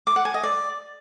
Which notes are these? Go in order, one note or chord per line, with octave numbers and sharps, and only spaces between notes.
D6
F#5
G#5
D#5
D5